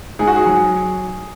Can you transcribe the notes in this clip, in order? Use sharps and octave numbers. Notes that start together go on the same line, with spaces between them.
G#2 G#4
F#4
G#4
F#3